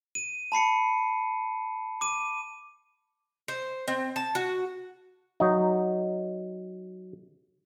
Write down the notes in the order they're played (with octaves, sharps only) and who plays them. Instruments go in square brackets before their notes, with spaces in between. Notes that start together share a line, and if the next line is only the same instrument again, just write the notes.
[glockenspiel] D#7
A5 B5 C7 C#7
D6 D#7
[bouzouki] C5
C4
A5
F#4
[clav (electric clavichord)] F#3 D#4